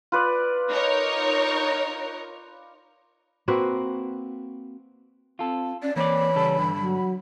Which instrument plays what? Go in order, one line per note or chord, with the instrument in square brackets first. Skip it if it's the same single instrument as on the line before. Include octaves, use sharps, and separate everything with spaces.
[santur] F4 B4 D5
[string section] D#4 A#4 C#5
[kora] A#3 C4 F#4 B4
[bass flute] C4 [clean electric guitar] F4 A4
[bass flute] C#4 [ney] D5
[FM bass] E3 [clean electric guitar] A#3 C4 D5 [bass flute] C#5 [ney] B5
[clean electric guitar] C#3 G3 A4
G2 D3
[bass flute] F#3